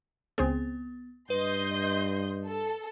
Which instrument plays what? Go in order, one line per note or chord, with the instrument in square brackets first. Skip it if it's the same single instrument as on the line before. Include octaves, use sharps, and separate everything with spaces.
[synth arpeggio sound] C#2 C4 G#4 [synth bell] B3
[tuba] G2 [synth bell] B4 [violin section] D#5 C6 G6
[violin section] A4